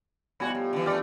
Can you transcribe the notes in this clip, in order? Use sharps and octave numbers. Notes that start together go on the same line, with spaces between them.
G#2 F3 G3 B3 D#4 F#4 G#5 G#6
A2
D3 E3
E3 A3 D4 G4 G#4 D5 F6